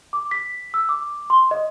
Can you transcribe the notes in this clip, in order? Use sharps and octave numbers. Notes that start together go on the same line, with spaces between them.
D6
B6
E6
D6
C6
D#5